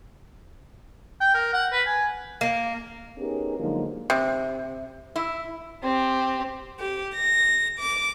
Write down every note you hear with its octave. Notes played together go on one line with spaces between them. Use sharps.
G5
A#4
F#5
B4
G#5
A#3
B3 C#4 D#4 G4 G#4 A#4
D3 F3 F#3 G#3 A#3 D#4
C3
E4
C4 G4
G4
A#6
D6